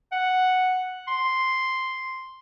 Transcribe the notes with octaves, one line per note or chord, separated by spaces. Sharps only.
F#5
C6